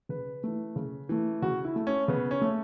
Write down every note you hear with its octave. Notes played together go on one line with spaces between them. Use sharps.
C#3 B4
E3 A3
C#3
E3 A3
C#3 F#4
E4
A3
C#4
C#3 B3
C#4
A3